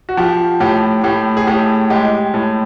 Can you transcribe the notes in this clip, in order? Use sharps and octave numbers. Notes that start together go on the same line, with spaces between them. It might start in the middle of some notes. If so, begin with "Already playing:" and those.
F#4
F3 G4
A2 G4
A2 G4
G#4
A2 G4
G#3 G4
A2